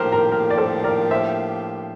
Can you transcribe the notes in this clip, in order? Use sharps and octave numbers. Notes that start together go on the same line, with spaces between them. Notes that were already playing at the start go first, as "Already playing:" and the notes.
Already playing: A2 F3 A#3 D4 G4 A#4 C5
A#4
A#4
D5
A4 C5
A#4 D5
C5 E5